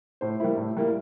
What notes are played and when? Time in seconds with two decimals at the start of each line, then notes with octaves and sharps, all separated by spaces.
0.21 A2 C5
0.40 G3 A#3 E4
0.58 A2
0.77 G3 A#3 E4